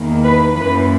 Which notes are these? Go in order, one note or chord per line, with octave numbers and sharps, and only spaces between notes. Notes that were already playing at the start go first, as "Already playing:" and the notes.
Already playing: E2 D#3 A#3
B4
F#2 E3 A#3 B4